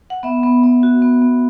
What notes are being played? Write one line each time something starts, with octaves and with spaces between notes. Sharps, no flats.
F#5
B3 E5
B3
B3
F#4
B3
B3